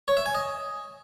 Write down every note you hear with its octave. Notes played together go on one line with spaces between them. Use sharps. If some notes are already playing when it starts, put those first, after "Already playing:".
C#5
E5
G#5
D#5